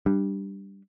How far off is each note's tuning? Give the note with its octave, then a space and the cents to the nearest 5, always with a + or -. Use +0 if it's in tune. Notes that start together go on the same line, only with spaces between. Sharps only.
G3 +0 D4 +5